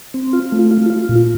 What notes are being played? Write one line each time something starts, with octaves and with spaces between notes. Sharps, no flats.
C4
F4
A3
F4
F4
A#2